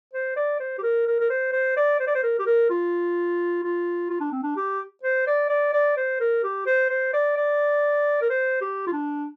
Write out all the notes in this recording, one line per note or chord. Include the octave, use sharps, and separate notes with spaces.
C5
D5
C5
G4
A#4
A#4
A#4
C5
C5
D5
C5
D5
C5
A#4
G4
A#4
F4
F4
F4
D4
C4
D4
G4
C5
D5
D5
D5
C5
A#4
G4
C5
C5
D5
D5
A#4
C5
G4
F4
D4